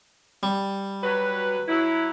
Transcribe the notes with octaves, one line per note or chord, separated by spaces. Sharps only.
G3
F#3 B4
F#3 E4